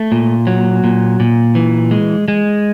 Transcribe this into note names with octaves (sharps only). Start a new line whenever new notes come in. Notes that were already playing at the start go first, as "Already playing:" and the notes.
Already playing: A3
A#2
F#3
A#2
A#2
E3
G#3
G#3